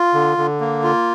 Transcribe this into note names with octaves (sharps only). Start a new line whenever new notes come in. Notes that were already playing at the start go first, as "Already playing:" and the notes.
Already playing: F4
D3
D3
A#3
F4